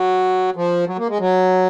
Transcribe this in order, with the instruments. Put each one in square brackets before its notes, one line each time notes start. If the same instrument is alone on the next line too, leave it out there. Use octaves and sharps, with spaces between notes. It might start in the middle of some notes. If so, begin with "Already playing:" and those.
Already playing: [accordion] F#3
F3
F#3
A#3
G#3
F#3